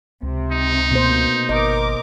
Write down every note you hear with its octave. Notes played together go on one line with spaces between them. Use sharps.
C#2 C3
D#4
B2 A#3 C5
G#1 A#4 D#5 D6